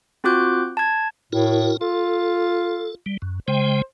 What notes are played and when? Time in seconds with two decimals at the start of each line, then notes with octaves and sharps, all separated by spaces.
0.24 C4 F4 F#4 D6 F#6 G6
0.77 A5 G#6
1.33 A2 E4 F#4 A#4
1.81 F4 A4
3.06 G3
3.22 F#2
3.48 C#3 G#3 C5 G5